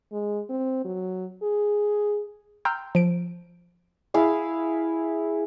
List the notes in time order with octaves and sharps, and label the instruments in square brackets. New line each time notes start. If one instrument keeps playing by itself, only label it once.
[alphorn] G#3
C4
F#3
G#4
[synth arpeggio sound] G5 A#5 C6 E6 F6 G6
F3 D7
[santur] E4 G#4 F5